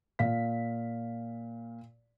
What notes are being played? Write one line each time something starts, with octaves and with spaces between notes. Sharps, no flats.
A#2 F5 B6